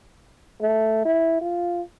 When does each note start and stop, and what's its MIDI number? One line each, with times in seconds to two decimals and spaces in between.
0.61 1.03 57
1.05 1.38 64
1.41 1.81 65